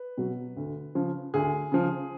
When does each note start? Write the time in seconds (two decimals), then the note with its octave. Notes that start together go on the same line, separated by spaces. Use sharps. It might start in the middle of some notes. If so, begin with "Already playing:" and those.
Already playing: B4
0.17 B2 F#3
0.56 D2
0.95 C#3 F3
1.34 D2 G#4
1.72 C#3 F3